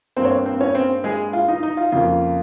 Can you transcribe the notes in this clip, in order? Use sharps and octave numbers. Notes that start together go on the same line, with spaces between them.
G2 G3 A#3 C4 C5
C#5
C4 C5
C4 C5
C#4 C#5
C4 C5
G#3 G#4
F4
D#4
D#4
F4
F2 C#3 F3 A#3 F4